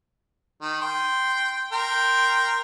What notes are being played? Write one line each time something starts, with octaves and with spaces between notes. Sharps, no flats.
D#3
G5 C6
A#4 G5 C6